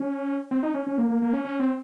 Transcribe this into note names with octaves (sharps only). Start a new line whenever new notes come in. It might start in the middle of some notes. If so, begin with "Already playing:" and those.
Already playing: C#4
C4
D#4
C#4
C#4
A#3
A#3
A#3
C#4
C#4
C4